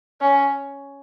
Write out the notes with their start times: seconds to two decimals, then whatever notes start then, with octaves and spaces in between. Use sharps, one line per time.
0.21 C#4